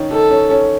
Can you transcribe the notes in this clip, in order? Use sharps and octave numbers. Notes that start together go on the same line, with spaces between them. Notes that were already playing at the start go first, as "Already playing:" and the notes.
Already playing: D#3 C#4
D#3 A4
C#4
C#4